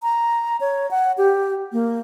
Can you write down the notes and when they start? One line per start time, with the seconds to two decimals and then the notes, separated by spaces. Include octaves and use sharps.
0.03 A#5
0.61 C#5
0.91 F#5
1.18 G4
1.72 A#3